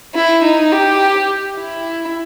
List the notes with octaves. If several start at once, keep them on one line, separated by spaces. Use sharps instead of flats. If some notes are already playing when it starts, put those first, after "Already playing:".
E4
D#4
G4
E4